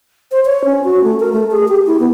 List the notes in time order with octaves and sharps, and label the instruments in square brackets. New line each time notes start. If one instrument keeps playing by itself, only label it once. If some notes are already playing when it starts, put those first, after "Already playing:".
[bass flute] C5
C#5
C#4
F#4
A3
A#4
A3
G#4
G4
E4
B3